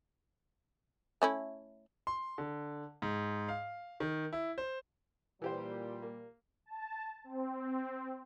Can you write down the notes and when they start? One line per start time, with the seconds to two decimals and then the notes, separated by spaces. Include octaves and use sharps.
1.22 A3 C#4 E4
2.07 C6
2.38 D3
3.02 G#2
3.49 F5
4.00 D#3
4.33 E4
4.58 C5
5.42 A#2 E3 G3 G4 C5
6.02 A#3
6.66 A5
7.24 C4